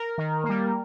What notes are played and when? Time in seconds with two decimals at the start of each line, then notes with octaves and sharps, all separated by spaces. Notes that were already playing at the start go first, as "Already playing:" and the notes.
Already playing: A#4
0.18 D#3
0.44 A#3
0.49 G3